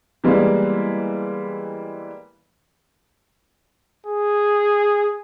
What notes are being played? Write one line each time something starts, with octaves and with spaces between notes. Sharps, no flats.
E3 G3 G#3 A#3 B3
G#4